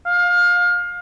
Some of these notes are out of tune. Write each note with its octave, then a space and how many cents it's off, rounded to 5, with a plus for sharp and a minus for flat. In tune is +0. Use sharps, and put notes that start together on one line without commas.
F5 +25